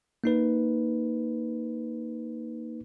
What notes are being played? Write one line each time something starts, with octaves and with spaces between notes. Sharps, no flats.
A#3 D#4 B4